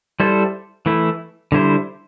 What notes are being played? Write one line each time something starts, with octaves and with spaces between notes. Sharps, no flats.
G3 E4 A4 C5
E3 A3 E4
D3 G3 E4 C5